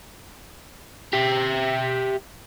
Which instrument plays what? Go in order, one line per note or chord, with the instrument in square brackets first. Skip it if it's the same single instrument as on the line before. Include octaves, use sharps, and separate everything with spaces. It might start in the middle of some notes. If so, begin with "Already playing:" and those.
[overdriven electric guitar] G4 E5